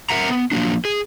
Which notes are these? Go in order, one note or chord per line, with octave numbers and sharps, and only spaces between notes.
A#4 E5 F#5 A#5
B3
F3 F#3 A#3 D4
G#4